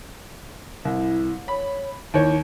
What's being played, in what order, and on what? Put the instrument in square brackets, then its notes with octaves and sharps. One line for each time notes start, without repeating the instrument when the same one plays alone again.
[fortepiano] C2 [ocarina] E4
[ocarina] C#5 [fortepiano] B5
[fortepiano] D#2 C#5 [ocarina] E4